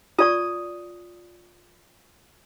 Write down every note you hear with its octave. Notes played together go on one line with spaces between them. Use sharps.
F4 D5 C#6 D#6